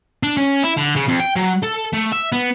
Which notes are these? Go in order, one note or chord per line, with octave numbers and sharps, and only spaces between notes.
D4
C#4
E4
D3
C#3
F2
G5
F#3
A4
A3
E5
B3